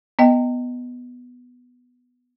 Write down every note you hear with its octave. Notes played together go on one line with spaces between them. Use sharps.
B3 D#5 G5